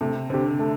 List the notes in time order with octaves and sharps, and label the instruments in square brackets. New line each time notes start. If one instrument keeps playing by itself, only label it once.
[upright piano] C3 [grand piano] A3
[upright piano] D3 [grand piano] C4 G4
[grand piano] A3